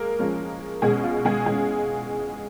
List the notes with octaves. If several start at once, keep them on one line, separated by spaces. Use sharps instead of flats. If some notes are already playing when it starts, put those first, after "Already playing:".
Already playing: G#3 A#3 A#4
F3 G#3 C#4
B2 G#3 C#4 G#4
F4
G#3 G#4
B2 G#3 C#4 G#4